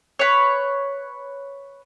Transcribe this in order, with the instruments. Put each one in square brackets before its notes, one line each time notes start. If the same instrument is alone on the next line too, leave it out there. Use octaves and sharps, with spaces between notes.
[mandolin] B4 C#5